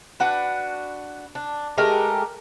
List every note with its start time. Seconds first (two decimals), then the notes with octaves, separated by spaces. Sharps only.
0.20 D4 F#4 B4
1.35 D4
1.78 G#3 A3 G4 A#4